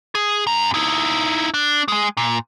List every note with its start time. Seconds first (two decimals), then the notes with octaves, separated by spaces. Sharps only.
0.15 G#4
0.47 F#2 A#5
0.74 D#4 E4
1.54 D4
1.88 G#3 G#4
2.17 A#2